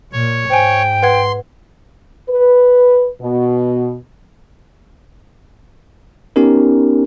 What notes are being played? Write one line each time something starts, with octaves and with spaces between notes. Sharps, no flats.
A#2 C#5
G#2 C5 G5 G#5
B4 F#5 C6 G#6
B4
B2
B3 C#4 D#4 G4 A#4